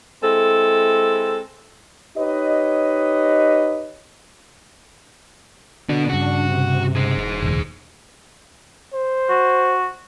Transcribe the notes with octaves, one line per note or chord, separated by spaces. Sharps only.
G#3 C4 E4 A4
D#4 G4 B4 C#5 D#5
D3 B3 D4 F#4
G2 C#3 F#4
C3
G#4 C5
E1
F1 A#1 D#2
C5
F#4